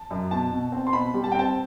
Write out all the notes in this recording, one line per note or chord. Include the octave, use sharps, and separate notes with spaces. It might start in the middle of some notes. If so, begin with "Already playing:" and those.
Already playing: A5
F#2
B2 A5
B2
C4
C6
B2 B5
G3
A5
G5
C4 A5